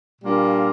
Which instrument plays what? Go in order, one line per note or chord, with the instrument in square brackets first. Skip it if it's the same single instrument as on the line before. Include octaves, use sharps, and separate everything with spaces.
[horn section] A#2 G3 A#3 D4 F4